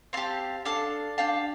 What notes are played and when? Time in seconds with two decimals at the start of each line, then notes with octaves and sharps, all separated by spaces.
0.13 C4 G4 F5 A5
0.65 D4 A4 F5 A5
1.18 D4 G4 F5 A5